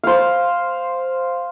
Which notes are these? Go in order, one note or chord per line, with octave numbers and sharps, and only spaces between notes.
C5 F5